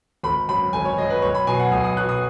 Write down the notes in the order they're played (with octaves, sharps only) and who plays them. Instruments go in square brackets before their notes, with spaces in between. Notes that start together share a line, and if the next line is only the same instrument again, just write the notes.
[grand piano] G#1 B5
F#2 F#3 B5
G#1 G#5
C#5
F#2 F#3 D#5
B4
B1 C#5
B5
B2 F#3 G#5
F#5
B1 D#6
D#6
B2 F#3 F#6
D#6